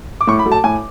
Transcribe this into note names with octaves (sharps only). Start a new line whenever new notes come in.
D6
A2 C#6
B5
F#3 A3
A5
A2 G#5